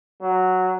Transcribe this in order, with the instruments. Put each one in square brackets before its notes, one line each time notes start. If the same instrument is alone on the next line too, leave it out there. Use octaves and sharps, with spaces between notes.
[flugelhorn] F#3